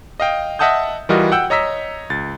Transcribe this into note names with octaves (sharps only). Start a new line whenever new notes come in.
D#5 F5 G5
D#5 E5 F#5 A5 D#6 G6
E3 G3 F4 F#4 A#4 D#5
F#5 G5 E6 G6
C#5 D#5 A#5 E6 B6
C#2 A6